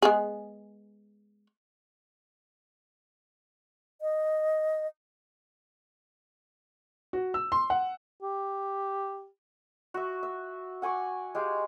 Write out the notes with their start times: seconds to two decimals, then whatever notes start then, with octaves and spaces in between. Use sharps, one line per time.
0.02 G#3 B3 G#4
4.01 D#5
7.13 F#4
7.34 E6
7.52 C6
7.70 F#5
8.23 G4
9.94 F#4 E5
10.23 E5
10.82 F#5 G#5 C#6 D6
11.35 G#3 G4 F5